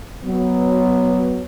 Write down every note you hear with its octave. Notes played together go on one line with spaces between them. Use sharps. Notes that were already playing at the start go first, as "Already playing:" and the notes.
F#3 B3